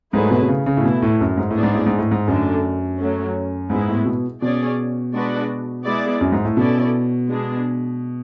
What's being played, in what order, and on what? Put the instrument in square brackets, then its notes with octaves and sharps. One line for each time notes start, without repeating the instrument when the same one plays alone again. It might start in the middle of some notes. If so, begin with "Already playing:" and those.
[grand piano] G#2 [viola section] F#3 A3 E4 G#4 B4
[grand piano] B2
B2
C#3
C#3
A2
[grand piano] B2 [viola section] E3 A3 E4
[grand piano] A2
F#2
G#2
A2
[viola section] B3 D4 G#4 D5
[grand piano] G#2
A2
G#2
A2
G#2
[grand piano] F#2 [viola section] D3 A3 D4 A4
[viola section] F#3 A3 C#4
[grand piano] G#2 [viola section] G#3 B3 E4
[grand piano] A2
B2
[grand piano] B2 [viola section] C#4 G#4 D5
[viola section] G#3 D4 F#4 B4 D5
G#3 B3 E4 G#4 D5
[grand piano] F#2
G#2
A2
[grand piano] B2 [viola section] C#4 E4 A4 D5
[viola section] G#3 B3 D4 G#4